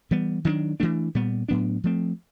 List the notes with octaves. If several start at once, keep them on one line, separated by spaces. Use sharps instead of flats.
E3 G3 B3
D#3 F#3 B3 D4
E3 A3 D4
A#2 G3 B3
A2 F#3 B3 D4
F3 A3 C4